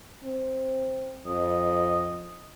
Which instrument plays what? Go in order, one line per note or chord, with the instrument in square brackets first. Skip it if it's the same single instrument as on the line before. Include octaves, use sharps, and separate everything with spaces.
[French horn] C4
[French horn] F2 [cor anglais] D#5